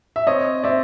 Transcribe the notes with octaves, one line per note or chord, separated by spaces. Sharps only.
E5
C4 C#5 D#5
C4 D5 E5